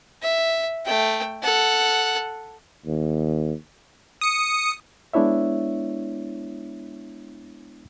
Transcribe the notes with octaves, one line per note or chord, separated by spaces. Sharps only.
E5
A3 G5
A4 F#5
D#2
D#6 C#7
G#3 B3 D4 E4 C#5 E5